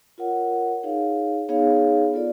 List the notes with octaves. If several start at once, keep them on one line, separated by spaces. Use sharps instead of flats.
F4 A#4 C#5 F#5
D#4 G#4 C#5 F5
B3 D#4 G#4 C#5 F5
F4 A4 D5